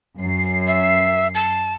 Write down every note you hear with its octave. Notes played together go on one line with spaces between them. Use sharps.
F#2 C7
E5
A5